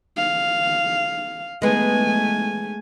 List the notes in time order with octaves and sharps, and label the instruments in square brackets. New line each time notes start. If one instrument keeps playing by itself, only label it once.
[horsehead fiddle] F5
[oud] G#3 B3 [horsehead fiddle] A3 G#5